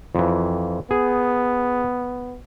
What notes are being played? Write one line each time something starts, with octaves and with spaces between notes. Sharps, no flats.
F2 E3
B3 G#4